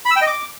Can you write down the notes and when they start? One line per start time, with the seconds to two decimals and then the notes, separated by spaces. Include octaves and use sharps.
0.05 B5
0.11 E6
0.16 G5
0.21 D#5
0.27 D6